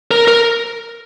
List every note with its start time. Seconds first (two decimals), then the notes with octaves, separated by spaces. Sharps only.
0.11 A#4
0.28 A#4